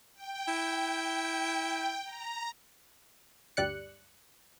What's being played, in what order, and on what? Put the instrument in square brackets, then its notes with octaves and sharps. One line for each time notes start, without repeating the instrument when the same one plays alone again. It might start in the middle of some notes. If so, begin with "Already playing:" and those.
[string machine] G5
[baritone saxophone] E4
[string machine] A#5
[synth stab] D2 G2 G3 D5 F#6 C#7